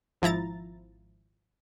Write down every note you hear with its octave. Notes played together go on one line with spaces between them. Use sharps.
G#1 F3 E4 A#5 A6